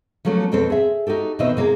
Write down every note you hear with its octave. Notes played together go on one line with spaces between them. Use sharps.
F3 F#3 A3 A#3 C#4
F2 B2 C4 C#4 A4 C5
G#4 E5
D#4 F#4 G4 A4
B2 D#3 C4 C5 D#5 E5
C3 A#3 F4 G#4